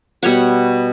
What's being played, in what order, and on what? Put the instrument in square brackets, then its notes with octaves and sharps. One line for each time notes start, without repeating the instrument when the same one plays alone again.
[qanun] B2 G3 C#5 F#5